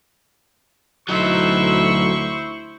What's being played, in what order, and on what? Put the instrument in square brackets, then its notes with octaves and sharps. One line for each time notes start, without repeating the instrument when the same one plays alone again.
[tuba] D2 [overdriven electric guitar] F#3 D#4 [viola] E4 C5 [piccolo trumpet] C#6